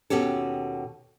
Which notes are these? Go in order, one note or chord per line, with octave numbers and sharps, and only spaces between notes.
D#2 B2 C#4 G4 A4